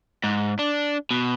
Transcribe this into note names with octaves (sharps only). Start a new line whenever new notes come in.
G#2
D4
B2